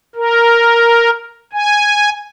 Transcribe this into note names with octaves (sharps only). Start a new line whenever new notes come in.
A#4
G#5